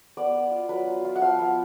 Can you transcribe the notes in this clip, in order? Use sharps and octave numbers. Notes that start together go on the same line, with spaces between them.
B3 D5
B3
F4
F#3 B4
F4
F4
F#5
F3 F5
B3